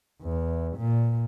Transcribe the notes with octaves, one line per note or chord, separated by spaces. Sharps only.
E2
A#2